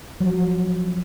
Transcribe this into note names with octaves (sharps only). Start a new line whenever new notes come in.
F3 F#3